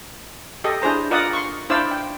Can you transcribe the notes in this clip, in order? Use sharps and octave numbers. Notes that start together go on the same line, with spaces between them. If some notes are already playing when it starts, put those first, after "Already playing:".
G4 A4 D#5
D4 E4 G#4 C5 A#5
F4 A#4 D5 D#5 F#5 D#6
C6 C#6
D4 E4 C5 D5 F5 E6
G5